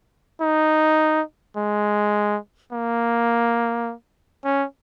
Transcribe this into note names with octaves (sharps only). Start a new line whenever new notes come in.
D#4
G#3
A#3
C#4